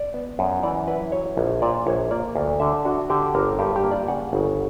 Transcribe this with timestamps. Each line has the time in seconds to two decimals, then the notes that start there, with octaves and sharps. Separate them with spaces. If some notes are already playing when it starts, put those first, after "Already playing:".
Already playing: D5
0.14 B3
0.39 F#2
0.63 E3 D5
0.88 E4 B4
1.12 F#3 C#5
1.37 A#1
1.62 A#2 D5
1.87 A#1 C#5
2.11 A#3 D5
2.35 D2
2.60 D3 E5
2.85 D4 F#4
3.10 D3 G4
3.35 G1 A#4
3.59 G2 G4
3.76 G4
3.84 A#3
3.92 D5
4.08 C#3 F#5
4.33 G1